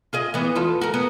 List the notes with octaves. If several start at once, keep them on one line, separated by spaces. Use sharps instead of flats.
F4 G#4 D#5
E3 B3
E2 F4 A4
F#4 A#4
B3